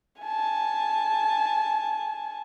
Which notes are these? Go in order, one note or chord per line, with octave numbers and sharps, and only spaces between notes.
G#5 A5